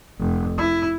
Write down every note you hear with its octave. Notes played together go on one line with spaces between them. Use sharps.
F1
E4